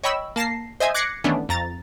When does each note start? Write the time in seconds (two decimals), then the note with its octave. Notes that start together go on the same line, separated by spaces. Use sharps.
0.03 C#5 D#5 G5 B5 C#6 E6
0.36 A#3 A5 A#6 C7
0.80 C5 D#5 E5 G#5
0.94 D6 F#6 G#6 A#6 C7 C#7
1.24 D#3 E3 A3 B3 C#4 D4
1.49 F2 A#5 A6